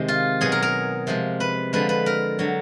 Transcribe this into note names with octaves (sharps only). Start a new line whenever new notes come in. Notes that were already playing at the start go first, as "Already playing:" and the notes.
Already playing: C3 D#3 G#3
F4
B2 F#3 G#4
A#4
A#4
C3 F3 G#3
B4
D3 F3 G#3 B4
B4
A#4
D3 F#3